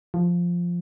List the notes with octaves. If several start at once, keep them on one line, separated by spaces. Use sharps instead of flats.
F3